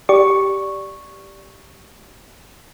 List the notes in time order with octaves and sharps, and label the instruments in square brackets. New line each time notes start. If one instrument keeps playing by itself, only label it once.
[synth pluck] G4 D5 C#6